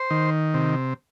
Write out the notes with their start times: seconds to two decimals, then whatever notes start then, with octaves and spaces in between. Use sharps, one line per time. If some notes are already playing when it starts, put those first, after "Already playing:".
Already playing: C5
0.10 D#3
0.54 C3